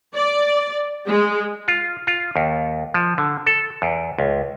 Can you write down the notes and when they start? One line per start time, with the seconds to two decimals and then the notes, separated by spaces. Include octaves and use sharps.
0.14 D5
1.08 G#3
1.68 F4
2.07 F4
2.36 D#2
2.94 F3
3.18 D3
3.46 A4
3.82 E2
4.18 C#2